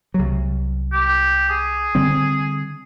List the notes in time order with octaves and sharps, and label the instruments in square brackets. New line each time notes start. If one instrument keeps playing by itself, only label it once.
[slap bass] C2 F#3
[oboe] G4
G#4
[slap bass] D3 G3 C4